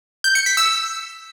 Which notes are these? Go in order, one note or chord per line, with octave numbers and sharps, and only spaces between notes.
G6
C#7
B6
E6